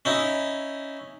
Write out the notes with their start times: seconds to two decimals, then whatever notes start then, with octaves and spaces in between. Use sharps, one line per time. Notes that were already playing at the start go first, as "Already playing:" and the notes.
0.05 C#4 D#4 E4